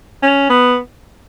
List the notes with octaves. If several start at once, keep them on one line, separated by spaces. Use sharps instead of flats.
C#4
B3